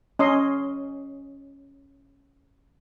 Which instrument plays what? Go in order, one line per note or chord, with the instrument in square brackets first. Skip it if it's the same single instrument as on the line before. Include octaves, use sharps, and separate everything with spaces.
[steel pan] C#4 D#5 C6